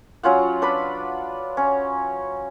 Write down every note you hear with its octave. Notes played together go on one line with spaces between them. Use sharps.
F#3 C#4 F4 F#5
D4 B4 D5 B5
C#4